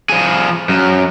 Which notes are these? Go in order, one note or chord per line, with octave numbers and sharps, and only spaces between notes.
F3 G#4
F#2